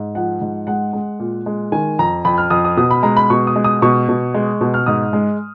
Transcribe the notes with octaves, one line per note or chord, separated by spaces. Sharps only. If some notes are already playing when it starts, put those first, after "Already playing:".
Already playing: G#2
F3 F#5
G#2
G#3 F#5
G#3
A#2
G#3
D#3 G#5
F2 A#5
F2 B5
F6
F2 D#6
D#6
B2 D#6
B5
G#3 A#5
B5
B2 C#6
D#6
G#3
D#6
B2 C#6
B2
G#3
B2
F6
G#2 D#6
G#3